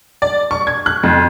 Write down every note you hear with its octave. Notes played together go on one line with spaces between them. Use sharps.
D5
C#6
G#6
F#6
F2